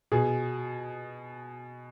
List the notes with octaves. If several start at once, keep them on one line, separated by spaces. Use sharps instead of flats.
B2 G#4